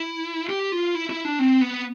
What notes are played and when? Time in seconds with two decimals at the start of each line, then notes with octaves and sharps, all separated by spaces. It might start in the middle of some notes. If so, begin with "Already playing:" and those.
Already playing: E4
0.49 G4
0.72 F4
0.95 E4
1.10 E4
1.25 D4
1.39 C4
1.61 B3